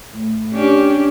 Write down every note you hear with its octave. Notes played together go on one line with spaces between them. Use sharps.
A2
C#4 D4 G4